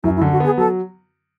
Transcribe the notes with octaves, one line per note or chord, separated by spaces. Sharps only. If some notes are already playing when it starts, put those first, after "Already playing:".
F#2 E4
E4
D3
F#4
B3 G#4
F#3 A4